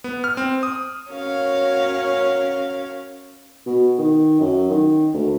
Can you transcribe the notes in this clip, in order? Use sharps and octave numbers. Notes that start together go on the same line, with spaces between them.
B3
F6
C4
D#6
C#4 F#4 A#4 C#5 F5
B2
D#3
F#2
D#3
D2